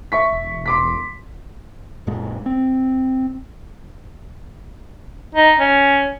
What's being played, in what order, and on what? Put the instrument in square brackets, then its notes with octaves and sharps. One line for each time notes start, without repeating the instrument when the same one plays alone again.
[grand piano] E5 C#6 B6
[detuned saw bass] E1
[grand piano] C6 D6 B6
[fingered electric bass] F#2 A#2 G#3
C4
[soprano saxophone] D#4
C#4